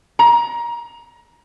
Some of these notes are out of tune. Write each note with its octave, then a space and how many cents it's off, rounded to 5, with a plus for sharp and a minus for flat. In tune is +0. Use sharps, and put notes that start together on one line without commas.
A#5 +25